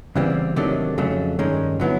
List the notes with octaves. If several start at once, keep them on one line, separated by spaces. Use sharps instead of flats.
E2 C#3 E3 G3 C4
C3 D#3 F#3 A3 D4
F2 C#3 F#3 A3
G2 D#3 G#3 C#4
D3 F#3 B3 E4